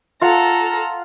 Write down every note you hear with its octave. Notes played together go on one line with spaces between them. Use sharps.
F4 A4 F#5 A#5